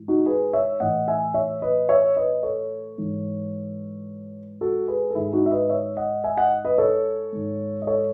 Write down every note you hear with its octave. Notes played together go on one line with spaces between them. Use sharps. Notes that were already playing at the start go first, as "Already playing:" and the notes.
Already playing: G#2 E3
D#4 F#4
G#4 B4
C#5 E5
A2 E3 D#5 F#5
E5 G#5
C#5 E5
B4 D#5
C#5 E5
B4 D#5
A4 C#5
G#2 E3
F#4 A4
G#4 B4
A4
G#2 D#3 E4 G#4
D#4 F#4
E5
B4 D#5
C#5 E5
D#5 F#5
E5 G#5
D#5 F#5
B4 D#5
A4 C#5
G#2 D#3
D#5
A4 C#5